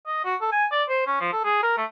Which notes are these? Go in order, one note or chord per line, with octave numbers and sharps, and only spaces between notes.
D#5
F#4
A4
G#5
D5
C5
C#4
F3
A4
G#4
A#4
A3